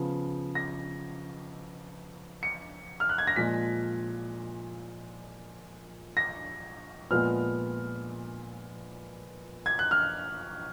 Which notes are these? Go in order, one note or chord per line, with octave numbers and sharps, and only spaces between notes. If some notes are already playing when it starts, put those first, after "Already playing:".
Already playing: C#3 F3 B3
A#6
C#7
F6
F#6
G#6
A#6
A#2 F3 G#3 B6
A#6
A#2 F3 G#3 B3 F6
G#6
F#6
F6